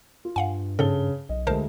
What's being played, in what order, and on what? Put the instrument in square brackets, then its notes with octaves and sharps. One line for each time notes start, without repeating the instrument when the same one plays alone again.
[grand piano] F4
[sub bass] G2 [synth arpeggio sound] F5 F#5 G#5
[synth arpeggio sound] G#2 A4 [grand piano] C#3 A5 G7
[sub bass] B1 [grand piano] D#5
[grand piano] D2 G#3 [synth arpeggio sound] A#4 C5 A5